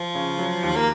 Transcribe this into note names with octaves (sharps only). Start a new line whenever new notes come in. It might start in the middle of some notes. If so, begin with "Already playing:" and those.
Already playing: F3
C#3
F#3
D#2
A#3